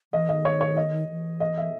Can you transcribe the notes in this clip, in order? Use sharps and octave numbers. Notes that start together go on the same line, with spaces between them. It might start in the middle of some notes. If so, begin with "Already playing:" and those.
E3 D#5
D#3 D#5
C#5
C#5
D#5
E3
D#5
E5